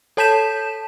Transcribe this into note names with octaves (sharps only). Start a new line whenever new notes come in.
A4 C#5 A5 G6 B6 E7